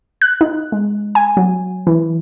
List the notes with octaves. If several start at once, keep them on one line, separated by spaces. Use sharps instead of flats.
F#6
D#4
G#3
G#5
F#3
E3